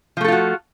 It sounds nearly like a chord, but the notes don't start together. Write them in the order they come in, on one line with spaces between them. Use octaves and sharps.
F3 A3 A4 F4 F#4